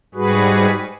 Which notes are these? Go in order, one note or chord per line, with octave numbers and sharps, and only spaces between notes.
G#2 G3 F#4 G#4 B4